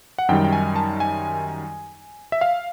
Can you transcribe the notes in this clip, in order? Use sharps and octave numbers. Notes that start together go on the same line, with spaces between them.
F#5
F#2 D#3 G3 G5
G5
G#5
A5
G#5
E5
F5